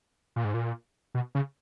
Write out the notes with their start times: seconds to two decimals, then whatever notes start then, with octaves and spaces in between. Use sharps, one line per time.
0.36 A#2
0.44 G#2
0.54 A#2
1.14 B2
1.35 C#3